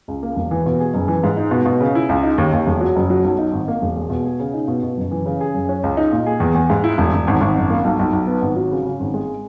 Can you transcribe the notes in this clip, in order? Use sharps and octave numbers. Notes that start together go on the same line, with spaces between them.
C#2
A#3
E1
E3
B2
G#4
F#1
E3
G#2
D#4
B2
B2
C#3
E4
C#2
D#4
D#2
D#2
E1
F#3
F#1
F#3
B1
D#4
G#1
A#3
E1
G#3
B2
G#4
C#3
D#4
B2
B2
F#1
E3
C#3
G#4
F#2
C#4
C#2
D#4
A#2
G#4
E2
E2
G#2
E4
E1
E1
G#1
G#1
F#1
A#3
B1
B1
B1
B3
G#1
F#3
C#3
C#3
G#1
G#3